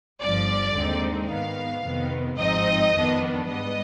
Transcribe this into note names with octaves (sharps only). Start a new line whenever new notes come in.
G1 G2 F3 D5
D#2 D3 G#3 C4 D#4
G#2 D#3 B3 F5
F2 C3 D#3 B3
G#1 G#2 F3 C4 D#4 D#5
F2 D#3 B3 D4
G#2 G3 B3 D#5